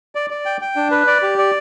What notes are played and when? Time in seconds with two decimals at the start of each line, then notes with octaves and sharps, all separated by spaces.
0.15 D5
0.30 D5
0.46 G5
0.61 G5
0.76 D4
0.91 B4
1.07 D5
1.22 G4
1.38 D5